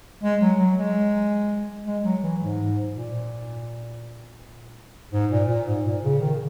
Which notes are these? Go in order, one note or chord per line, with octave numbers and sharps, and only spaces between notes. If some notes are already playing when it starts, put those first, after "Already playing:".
G#3
F#3
F#3
G#3
G#3
F#3
E3
G#2
A#2
G#2
A#2
A#2
G#2
A#2
C#3
D#3